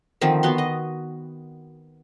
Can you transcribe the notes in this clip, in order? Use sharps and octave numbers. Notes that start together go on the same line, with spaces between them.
D3 D#3 F3 C4
B3 F#4 C6
D#5